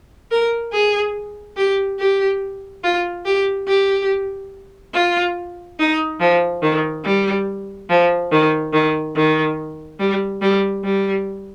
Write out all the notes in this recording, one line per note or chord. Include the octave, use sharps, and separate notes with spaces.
A#4
G#4
G4
G4
F4
G4
G4
F4
D#4
F3
D#3
G3
F3
D#3
D#3
D#3
G3
G3
G3